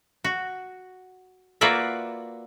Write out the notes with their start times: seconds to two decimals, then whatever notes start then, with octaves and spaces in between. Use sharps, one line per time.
0.24 F#4
1.61 A#3 F4 F#4 B4 D5 E5